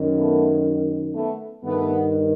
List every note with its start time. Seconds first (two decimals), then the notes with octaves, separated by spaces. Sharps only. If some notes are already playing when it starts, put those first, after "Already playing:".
Already playing: F#2 D#3
0.17 A3 B3
1.14 A3 B3
1.63 G2 D#3 A3 B3